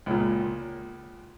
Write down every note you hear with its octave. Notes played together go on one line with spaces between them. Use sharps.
C#2 A#2